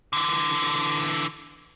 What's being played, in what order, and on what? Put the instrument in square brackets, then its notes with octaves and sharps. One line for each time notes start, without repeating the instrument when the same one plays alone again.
[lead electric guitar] D3 E3